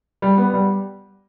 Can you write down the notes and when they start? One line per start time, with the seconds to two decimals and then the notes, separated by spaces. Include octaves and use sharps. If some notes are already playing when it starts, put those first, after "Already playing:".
0.22 G3
0.38 B3
0.54 G3